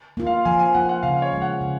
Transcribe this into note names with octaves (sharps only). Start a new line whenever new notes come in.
A#3 F4
F5
F3 G#5
G#5
A#3 F4 F#5
F#5
C#3 F5
C#5
F3 G#3
F#5
C#3